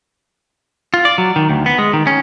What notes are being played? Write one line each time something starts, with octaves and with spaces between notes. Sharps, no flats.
F4
D5
F#3
D#3
D2
B3
G#3
D#3
C#4